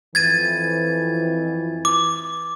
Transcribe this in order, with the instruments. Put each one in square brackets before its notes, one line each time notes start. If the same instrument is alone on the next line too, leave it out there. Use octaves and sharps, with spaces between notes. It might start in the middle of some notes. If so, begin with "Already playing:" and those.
[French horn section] F2 E3 [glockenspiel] G#6 A6 D#7
[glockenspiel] D6